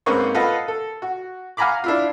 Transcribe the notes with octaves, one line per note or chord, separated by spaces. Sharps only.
G#2 A#3 C4 C#4 B4 C#6
F4 A4 B4 D#5 F5 F#5
A4
F#4
F5 F#5 G#5 A#5 B5 D6
D4 E4 F4